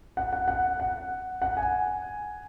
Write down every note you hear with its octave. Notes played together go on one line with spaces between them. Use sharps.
F#5
F#5
F#5
F#5
F#5
G#5